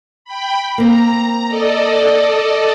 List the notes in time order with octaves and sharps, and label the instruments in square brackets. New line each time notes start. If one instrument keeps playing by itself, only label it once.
[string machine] G5 B5
[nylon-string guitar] A#3 C4 [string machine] A#5
[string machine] A4 D5 D#5